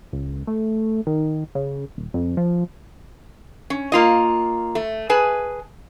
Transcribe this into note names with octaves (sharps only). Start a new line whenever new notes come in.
C#2
A3
D#3
C#3
D#1
F2
F3
C#4
A#3 F4 D#5
A3
G#4 B4 G#5 A5